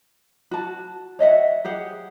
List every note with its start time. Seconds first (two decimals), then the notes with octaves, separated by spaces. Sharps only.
0.51 F#4 A5
1.19 C#5 D#5 E5 F#5
1.65 G4 G#4 F#5